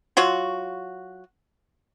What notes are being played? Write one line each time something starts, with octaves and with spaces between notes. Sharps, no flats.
F#3 F4 F#4